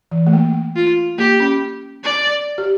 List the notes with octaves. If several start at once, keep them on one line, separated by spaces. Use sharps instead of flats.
E3
A3
A#3
F4
A#3 G4
C#4
D5
G4